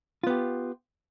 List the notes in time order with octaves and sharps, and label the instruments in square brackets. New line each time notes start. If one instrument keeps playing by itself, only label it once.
[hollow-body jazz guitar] F4
B3
G4